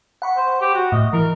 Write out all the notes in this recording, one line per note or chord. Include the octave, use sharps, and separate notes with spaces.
F#5 B5 C#6
C5
G4
F#4
A2 D#5
E3 A#4